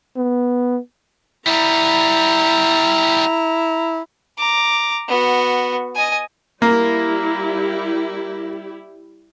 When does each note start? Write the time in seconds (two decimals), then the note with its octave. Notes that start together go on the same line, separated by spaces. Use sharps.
0.16 B3
1.47 G3 B3 E4 A#5
4.38 A#5 D6
5.08 B3 F#4
5.95 D#5 G#5
6.62 G3 A#3 E4 G4